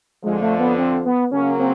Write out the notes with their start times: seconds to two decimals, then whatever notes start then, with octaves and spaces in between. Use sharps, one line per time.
0.23 F2 D3 F3 G#3
0.41 A3
0.59 B3
0.78 C4
1.05 B3
1.32 C#3 F#3 A#3 C#4
1.59 C4